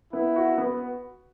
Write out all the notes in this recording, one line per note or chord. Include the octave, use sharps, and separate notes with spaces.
B3 E4
F#4
B3